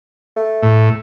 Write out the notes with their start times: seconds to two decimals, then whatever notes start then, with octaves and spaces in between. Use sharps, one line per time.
0.36 A3
0.63 A2